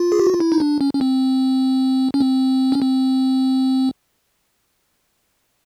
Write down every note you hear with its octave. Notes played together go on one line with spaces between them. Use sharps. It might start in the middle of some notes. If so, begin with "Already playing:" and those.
Already playing: F4
G#4
G4
F#4
F4
E4
D#4
D4
C#4
C#4
C4
C#4
C4
C#4
C4